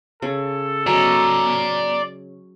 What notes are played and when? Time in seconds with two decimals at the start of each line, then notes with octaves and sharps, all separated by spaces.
0.22 C#3 A4
0.87 F#3 C#4 D5 D#5 A#5